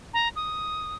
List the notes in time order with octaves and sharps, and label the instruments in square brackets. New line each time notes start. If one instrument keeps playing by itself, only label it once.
[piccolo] A#5
D#6